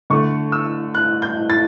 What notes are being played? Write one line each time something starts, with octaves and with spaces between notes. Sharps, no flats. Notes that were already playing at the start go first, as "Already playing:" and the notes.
D3 A3 C#6
E6
F#6
G6
A6